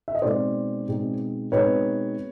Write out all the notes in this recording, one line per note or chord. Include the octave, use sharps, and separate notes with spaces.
E5
D#5
B2 G#3 C4 D#4 C5 D5
B2 G#3 C4 D#4
B2 G#3 C4 D#4 B4 C#5